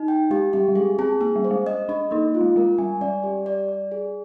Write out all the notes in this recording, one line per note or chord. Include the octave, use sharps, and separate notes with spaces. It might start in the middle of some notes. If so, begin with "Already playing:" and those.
Already playing: D#4
G5
G#3 G4
G3 G4
G3
G#3 G#4
C4 G#4
A#3 G#4
G3
C5
G#3
D#5
D4 D#5
A#3 D#4
F4
G#3
G#3 A#4
G3 G#5
G3 D5
G4
D5
D5
G#4